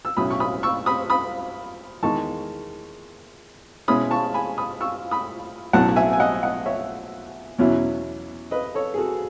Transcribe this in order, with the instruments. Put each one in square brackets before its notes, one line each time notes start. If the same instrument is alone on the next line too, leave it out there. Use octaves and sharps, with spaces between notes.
[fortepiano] E6
B1 A2 F#3 C#4 E4 B5 D#6
C#6
B5 D#6
C#6 E6
B5 D#6
B5 D#6
E2 D#3 G#3 D#4 A5 C#6
B2 G#3 C#4 E4 B5 D#6
A5 C#6
G#5 B5
B5 D#6
C#6 E6
B5 D#6
B1 A2 F#3 C#4 F#5 A5
E5 G#5
G#5
D#5 F#5
D#5 F#5
C#5 E5
E2 B2 F#3 C#4 E4
B4 D#5
A4 C#5
G#4
F#4 A4